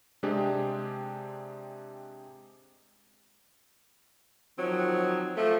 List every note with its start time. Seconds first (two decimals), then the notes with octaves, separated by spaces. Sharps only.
0.23 C3 G#3 C4 D4 G4 G#4
4.59 D#3 F3 F#3 C4
5.37 F3 A3